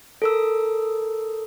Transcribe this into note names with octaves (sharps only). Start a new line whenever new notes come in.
A4 A#4 E6